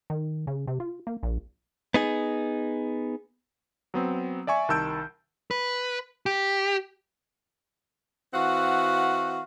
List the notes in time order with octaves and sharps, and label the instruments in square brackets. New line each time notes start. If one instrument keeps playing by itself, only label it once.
[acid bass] D#3
C#3
C3
F4
A#3
A#1
[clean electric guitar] B3 D#4 G#4
[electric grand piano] F#3 B3 C4
D5 E5 G#5 C#6
C2 D#3 A5 E6 G6 D7
[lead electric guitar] B4
G4
[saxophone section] E3 C4 F#4 F5 F#5